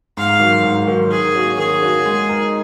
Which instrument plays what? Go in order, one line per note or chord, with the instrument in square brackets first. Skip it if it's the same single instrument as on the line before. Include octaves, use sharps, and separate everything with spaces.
[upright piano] G#2 [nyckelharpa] F5
[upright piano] D#3 F#3
G#2
D#3 F#3
[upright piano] D#3 [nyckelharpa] G#4
[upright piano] A#3 C#4 F#4
[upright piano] D#3 [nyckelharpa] G#4
[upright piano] A#3 C#4 F#4
G#3
D#4 A#4